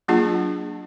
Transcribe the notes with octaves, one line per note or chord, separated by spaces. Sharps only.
F#3 A#3 D4 F4 G#4 A5